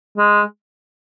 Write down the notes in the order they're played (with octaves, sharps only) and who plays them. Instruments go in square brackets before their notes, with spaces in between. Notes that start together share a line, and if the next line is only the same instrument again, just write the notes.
[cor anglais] G#3